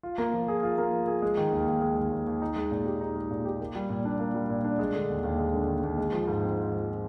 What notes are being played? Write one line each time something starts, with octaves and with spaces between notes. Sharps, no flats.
F4
A#3
F3
G#4
F4
A#3
F3
G#4
G#3
D#3
D#2
D#2
G#3
D#3
D#2
D#2
D#4
G#3
A#2
G4
D#4
G#3
A#2
G4
A#3
G3
A#2
D4
A#3
G3
A#2
D4
G#3
D3
D#2
D#2
G#3
D3
D#2
D#2
G#3
F3
G#2
C4
G#3
F3